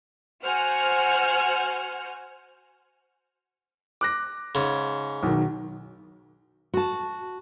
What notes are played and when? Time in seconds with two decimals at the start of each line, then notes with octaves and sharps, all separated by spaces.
0.44 F#4 C5 F#5 G#5 F6
4.01 D6 F#6 A#6
4.55 G#2 C#3
5.23 B1 D#3
6.74 F#4 A5